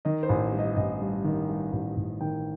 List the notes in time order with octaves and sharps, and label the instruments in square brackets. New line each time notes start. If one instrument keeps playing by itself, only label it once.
[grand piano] D#3 D#5
C5
A1
G2
D#5
A1 D#5
G2
D#3
G2
A1
A1
D#3 G5